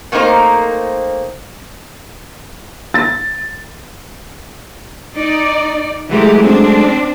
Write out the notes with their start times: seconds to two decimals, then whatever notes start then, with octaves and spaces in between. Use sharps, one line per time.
0.12 A3 A#3 C4 D#4 A#4 C5
2.94 A6
5.14 D#4 D5
6.11 E3 F#3 G#3 A3 G4
6.43 C4 D4